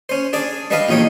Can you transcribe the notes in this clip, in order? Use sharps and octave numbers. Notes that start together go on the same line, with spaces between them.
C#4 C5
D4 G#4 D5
G3 D4 B4 D#5 F5
A#1 E2 D#4 C#5 G5